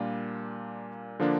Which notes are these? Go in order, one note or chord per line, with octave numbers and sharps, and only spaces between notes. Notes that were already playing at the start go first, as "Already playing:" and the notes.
Already playing: A#2 G3 A#3 D4 F4
D3 F3 A#3 D4